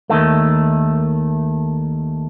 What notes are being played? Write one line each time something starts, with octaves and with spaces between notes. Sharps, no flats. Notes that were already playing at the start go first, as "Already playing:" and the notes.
D#2 D#3 A3